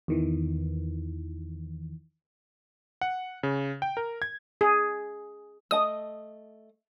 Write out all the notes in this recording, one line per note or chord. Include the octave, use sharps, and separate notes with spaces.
E2 D#3 E3
F#5
C#3
G5
A#4
G#6
G#4
A3 D#5 A5 D#6